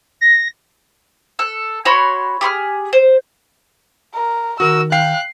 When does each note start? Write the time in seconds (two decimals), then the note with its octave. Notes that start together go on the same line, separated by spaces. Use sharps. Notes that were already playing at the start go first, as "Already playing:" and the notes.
0.21 A#6
1.39 A4 F#6
1.85 F#4 C#5 B5 C6
2.41 G4 G#4 C6 F6
2.93 C5
4.14 A#4
4.60 D#3 F#4 A#4 E6
4.92 F5 G5 F#6 C7